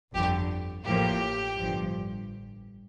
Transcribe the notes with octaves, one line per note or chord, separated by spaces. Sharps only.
G1 F2 D3 G4
A1 A2 F3 A#3 G4
G1 G2 F3